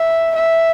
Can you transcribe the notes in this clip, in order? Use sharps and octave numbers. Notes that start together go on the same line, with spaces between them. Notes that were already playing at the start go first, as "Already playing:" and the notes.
Already playing: E5
E5